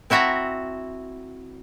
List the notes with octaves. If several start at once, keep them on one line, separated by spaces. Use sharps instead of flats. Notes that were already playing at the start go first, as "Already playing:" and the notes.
C4 E4 F#4 E5 A5 A#5